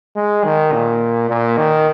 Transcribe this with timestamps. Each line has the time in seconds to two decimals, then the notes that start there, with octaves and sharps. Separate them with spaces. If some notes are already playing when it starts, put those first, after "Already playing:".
0.16 G#3
0.44 D#3
0.72 A#2
1.29 A#2
1.57 D#3